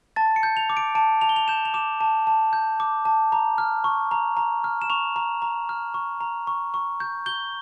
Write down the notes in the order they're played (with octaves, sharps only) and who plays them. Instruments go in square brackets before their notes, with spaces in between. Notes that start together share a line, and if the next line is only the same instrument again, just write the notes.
[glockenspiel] A5 A6
C#7
G6
F7
D6
D7
A5 D7
A5 F7
G7
F7
G6 E7
F7
D6 E7
A5
A5
G6
D6
A5
A#5
F6
C#6
A#5
A#5
F6
E7
C#6 F7
A#5
A#5
F6
C#6
A#5
C#6
C#6
G6
G6 G7